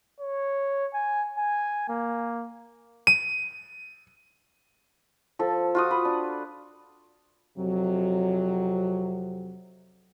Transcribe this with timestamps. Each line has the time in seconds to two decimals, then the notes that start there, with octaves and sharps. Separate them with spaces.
0.20 C#5
0.94 G#5
1.38 G#5
1.89 A#3
3.07 D#7
5.39 F3 A4
5.75 F4 F#4 D#6
5.91 B4
6.05 D4
7.58 F2 C3 F#3